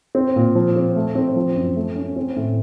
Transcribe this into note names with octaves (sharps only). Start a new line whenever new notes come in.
C4
A#2
F3
C4
A3
C4
F3
F#2
A3
C#4
C4
A2